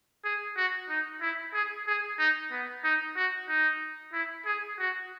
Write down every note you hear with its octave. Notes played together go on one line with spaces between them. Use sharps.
G#4
F#4
D#4
E4
G#4
G#4
D#4
B3
D#4
F#4
D#4
E4
G#4
F#4